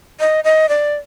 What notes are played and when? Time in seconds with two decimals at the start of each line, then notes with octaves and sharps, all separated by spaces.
0.20 D#5
0.44 D#5
0.69 D5